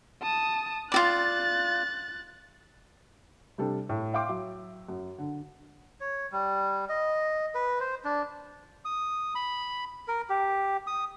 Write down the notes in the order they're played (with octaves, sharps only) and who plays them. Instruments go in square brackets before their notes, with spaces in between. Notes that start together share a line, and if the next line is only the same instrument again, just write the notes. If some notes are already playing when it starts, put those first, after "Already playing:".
[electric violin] A5 D#6
[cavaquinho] F4 F#4 D5 [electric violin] F#6 A6
[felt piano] C3 G3 D4 A4
A2
E5 F5 G5 C6 D6
F#3 E5
F#2
D3
[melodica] C#5
G3
D#5
B4
C5
D4
D#6
B5
A#4
G4
D#6